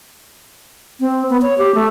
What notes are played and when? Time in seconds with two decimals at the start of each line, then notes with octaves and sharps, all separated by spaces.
1.00 C4
1.30 B3
1.42 C#5
1.58 G4
1.75 A3